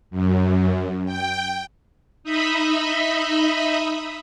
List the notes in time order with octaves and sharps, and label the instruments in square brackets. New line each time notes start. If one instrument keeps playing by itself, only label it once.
[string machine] F#2
G5
D#4 D#5 E5 B5